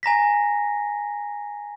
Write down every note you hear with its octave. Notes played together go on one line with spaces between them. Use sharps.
G#5 A#5 A#6 B6